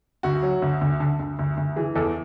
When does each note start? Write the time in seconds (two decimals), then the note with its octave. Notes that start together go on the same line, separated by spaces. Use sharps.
0.23 D2 F#4
0.43 F#3
0.62 D2
0.81 D2
1.00 D3
1.19 D2
1.39 D2
1.57 D2
1.76 E3 G#4
1.96 E2 A4